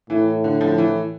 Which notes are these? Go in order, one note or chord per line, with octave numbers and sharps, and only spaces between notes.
A2 E3
D3
D3 F3
E3